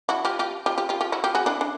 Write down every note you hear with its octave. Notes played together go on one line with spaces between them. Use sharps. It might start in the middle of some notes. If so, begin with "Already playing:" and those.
E4 F#4
F4 G4
F4 G4
F4 G4
F4 G4
F4 G4
F4 G4
E4 F#4
F4 G4
F#4 G#4
D4 E4
D4